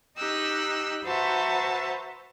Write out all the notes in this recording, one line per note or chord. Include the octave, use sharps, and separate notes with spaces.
D#4 G4 E6 F#6
F#4 B4 C5 E5 A5 A#5